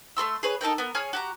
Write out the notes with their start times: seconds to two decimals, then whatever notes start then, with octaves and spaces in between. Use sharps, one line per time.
0.17 A3 A4 C6 E6
0.43 G#4 B4 C#5
0.61 D#4 A4 A#4 G5
0.78 B3 A#4
0.95 G#4 C#5 G#5 F6
1.13 F#4 G4 A#5